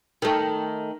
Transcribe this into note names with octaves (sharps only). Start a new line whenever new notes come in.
D#3 A3